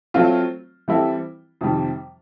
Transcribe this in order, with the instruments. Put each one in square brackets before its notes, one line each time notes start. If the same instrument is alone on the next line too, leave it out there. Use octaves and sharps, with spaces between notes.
[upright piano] F#3 A3 C4 F4
E3 G3 C4 E4 A4
F2 C3 D#3 G3